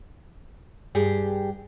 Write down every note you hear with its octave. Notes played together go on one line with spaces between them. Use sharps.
G2 G4 G#4